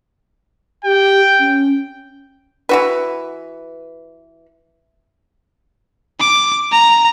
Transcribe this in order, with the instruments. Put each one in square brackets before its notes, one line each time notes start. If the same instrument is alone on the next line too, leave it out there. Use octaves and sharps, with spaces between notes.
[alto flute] G4 [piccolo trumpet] G5
[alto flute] C#4
[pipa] E3 F#4 B4
[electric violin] D6
A#5